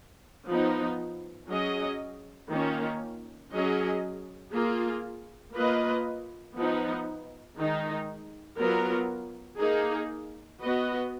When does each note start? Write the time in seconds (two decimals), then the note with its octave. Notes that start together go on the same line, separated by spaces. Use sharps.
0.48 F3 B3 D#4
1.49 F#3 C#4 G#4 D#5
2.50 D#3 A#3 C#4 F4
3.52 F#3 C#4 G#4 D#5
4.53 A#3 F4 G#4
5.54 A#3 F4 B4 D#5
6.56 F3 B3 D#4
7.57 D#3 G#3 D#4
8.58 F#3 B3 F4 A#4
9.59 A#3 D#4 G#4
10.60 B3 F#4 B4 D#5